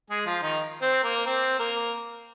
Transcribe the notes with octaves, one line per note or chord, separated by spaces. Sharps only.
G#3 G#4
F3 F4
D#3 D#4
C4 C5
A#3 A#4
C4 C5
A#3 A#4